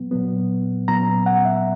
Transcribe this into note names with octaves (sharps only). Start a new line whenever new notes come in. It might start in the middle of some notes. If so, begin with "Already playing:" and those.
Already playing: A#2 F#3 B3
A#2 F#3 B3
A#2 F#3 B3 A#5
F#5
E5